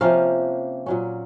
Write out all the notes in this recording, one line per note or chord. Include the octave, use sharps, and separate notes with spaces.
C3 F3 A#3 C#4 F5
A#2 F#3 C#4